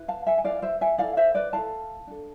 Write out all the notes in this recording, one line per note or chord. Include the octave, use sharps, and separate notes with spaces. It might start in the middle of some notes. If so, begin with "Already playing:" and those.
Already playing: E4 B4
F5 A5
E5 G#5
G#5
E4 B4 D5 F5
C5 E5
E5 G#5
E4 A4 D5 F5
C5 E5
B4 D5
E4 A4 F5 A5
D4 A4